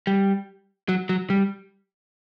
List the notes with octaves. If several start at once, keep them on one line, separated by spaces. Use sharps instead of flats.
G3
F#3
F#3
G3